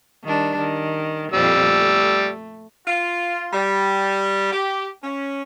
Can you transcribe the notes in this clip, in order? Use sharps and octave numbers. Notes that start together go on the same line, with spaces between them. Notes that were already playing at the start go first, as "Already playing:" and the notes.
D#3 G3 D4
D#3
F2 A#2 G3 C4 E6
A3
F4
G3
G4
C#4